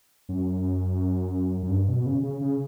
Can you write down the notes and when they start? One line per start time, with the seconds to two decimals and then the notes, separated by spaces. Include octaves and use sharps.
0.29 F#2
1.63 F#2
1.70 G2
1.88 B2
2.06 C#3
2.23 C#3
2.41 C#3